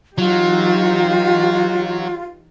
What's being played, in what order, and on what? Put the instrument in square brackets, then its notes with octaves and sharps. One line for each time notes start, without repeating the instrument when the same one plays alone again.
[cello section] E3 D#4 G4 [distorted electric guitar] F#3 [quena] F4